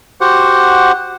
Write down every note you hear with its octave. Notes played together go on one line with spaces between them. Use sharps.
F#4 G4 C5 F#5